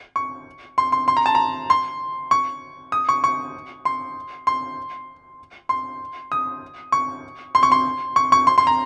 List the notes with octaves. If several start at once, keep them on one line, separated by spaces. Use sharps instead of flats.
C#6
C6
C6
C6
A#5
A5
A#5
C6
C#6
D#6
C#6
C#6
C6
C6
C6
D#6
C#6
C6
C#6
C6
C#6
C#6
C6
C6
A#5